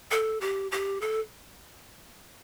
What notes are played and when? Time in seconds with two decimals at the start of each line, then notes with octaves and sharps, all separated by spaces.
0.11 A4
0.41 G4
0.71 G4
1.01 A4